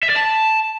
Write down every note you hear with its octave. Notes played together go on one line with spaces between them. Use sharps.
E5
D5
A5